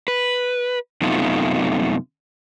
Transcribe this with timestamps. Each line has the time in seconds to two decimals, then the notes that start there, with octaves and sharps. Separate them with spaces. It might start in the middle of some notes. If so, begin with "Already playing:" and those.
0.08 B4
1.01 F#2 C3 A3 B3 D#4 F4